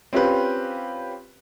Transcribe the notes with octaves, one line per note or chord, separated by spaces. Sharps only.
C4 C#4 F4 G4 B4